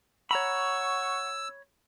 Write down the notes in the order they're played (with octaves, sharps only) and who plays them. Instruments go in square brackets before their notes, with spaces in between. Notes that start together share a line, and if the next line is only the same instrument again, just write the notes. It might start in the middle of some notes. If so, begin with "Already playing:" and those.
[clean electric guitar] C#5 A#5 B5 [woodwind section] F#5 C#6 [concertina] E6